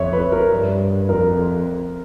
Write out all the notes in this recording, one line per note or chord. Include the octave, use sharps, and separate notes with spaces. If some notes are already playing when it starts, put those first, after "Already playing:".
Already playing: F2 C#5 E5
B4
A#4
G2
F2 A#4